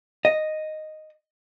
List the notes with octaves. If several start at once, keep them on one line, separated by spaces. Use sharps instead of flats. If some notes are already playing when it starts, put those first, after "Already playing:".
D#5